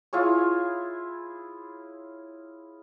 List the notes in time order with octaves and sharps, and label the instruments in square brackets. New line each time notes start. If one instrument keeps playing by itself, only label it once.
[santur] E4 F4 G#4 C#5